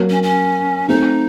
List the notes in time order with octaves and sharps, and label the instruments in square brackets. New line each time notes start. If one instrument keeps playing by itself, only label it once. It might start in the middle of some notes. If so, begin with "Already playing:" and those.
Already playing: [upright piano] F#3 A#3
[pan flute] C#4
C#4
[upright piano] A3 C4 [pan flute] D#4